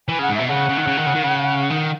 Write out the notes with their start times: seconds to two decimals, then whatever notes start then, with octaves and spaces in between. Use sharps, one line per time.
0.08 E3 G#5
0.19 C#3 F#5
0.29 G#2
0.35 B2 E5
0.49 C#3 F#5
0.69 C#3
0.78 D#3
0.87 C#3
0.97 D#3
1.06 C#3
1.14 D#3
1.24 C#3
1.70 D#3